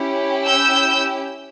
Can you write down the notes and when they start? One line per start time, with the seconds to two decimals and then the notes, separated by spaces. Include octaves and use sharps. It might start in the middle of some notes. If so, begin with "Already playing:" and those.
Already playing: C#4 E4 G4
0.45 E6 G6